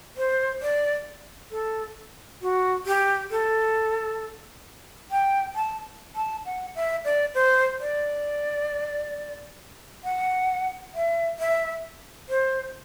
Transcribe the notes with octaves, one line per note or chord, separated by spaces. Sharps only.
C5
D5
A4
F#4
G4
A4
G5
A5
A5
F#5
E5
D5
C5
D5
F#5
E5
E5
C5